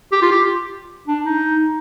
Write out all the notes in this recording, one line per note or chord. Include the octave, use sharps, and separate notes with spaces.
G4
F4
G4
D4
D#4